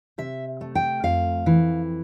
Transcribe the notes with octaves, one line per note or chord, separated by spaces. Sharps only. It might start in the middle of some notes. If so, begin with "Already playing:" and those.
C3 E5
A3
G5
F2 F5
E3